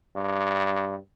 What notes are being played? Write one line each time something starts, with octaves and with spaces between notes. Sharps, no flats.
G2